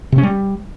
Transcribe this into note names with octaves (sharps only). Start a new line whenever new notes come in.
C3
C#4
G3